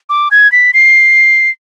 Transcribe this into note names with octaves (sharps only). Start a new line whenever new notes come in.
D6
G#6
B6
C7